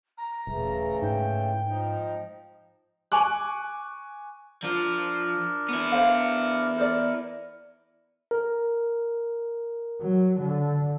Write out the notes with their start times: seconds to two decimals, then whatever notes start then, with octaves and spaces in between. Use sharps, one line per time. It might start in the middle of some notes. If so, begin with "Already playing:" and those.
0.18 A#5
0.47 D#1 C#3 E3 A3
1.02 G#2 G5
1.65 F3 D#4
3.12 G#5 C#6 D6 F#6
4.63 F3 D4 F4 A#4
5.69 B3 E4
5.92 C5 F5
6.77 A#4 C5 D5
8.31 A#4
10.01 F#3
10.40 D3